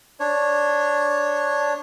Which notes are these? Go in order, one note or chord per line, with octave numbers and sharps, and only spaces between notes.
D4 C#5